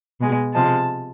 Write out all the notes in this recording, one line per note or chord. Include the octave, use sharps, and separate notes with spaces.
B2 G#3
C3 F3 G#3 A5